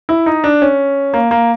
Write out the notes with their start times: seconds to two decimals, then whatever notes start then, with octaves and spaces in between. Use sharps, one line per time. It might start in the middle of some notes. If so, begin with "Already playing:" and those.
0.09 E4
0.26 D#4
0.44 D4
0.62 C#4
1.14 A#3
1.31 A#3